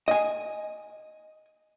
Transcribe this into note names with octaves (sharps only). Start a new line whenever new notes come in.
D#5 G#5